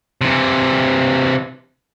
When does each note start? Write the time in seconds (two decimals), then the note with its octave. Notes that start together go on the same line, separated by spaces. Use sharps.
0.21 C3 E3